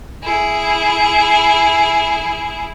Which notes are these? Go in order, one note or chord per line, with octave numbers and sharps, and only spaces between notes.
E4 G#4